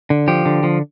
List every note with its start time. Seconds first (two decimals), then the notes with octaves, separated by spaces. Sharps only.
0.10 D3
0.28 F3 G4
0.46 D3
0.63 F3